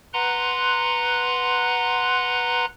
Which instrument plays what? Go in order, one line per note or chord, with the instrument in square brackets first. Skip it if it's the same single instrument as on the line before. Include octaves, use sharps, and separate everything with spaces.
[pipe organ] B4 F#5 A#5 C6 F#6